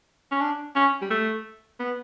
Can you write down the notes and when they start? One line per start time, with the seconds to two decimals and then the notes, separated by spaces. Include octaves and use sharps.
0.32 C#4
0.41 D4
0.76 C#4
1.01 G3
1.10 A3
1.80 B3